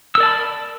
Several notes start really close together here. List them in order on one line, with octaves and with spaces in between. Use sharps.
E6 A#4 D5 A5 B5